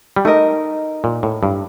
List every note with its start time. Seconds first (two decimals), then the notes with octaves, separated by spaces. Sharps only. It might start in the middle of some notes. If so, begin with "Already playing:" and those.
0.16 G3
0.25 A3 D#4 A#4 D#5
1.04 A#2
1.23 A2
1.43 G2